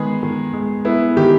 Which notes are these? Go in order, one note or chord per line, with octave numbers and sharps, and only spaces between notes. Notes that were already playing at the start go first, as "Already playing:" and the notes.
Already playing: D#3 G#3 B3 G#4
D#3
G#3
B3 E4
D#3 G4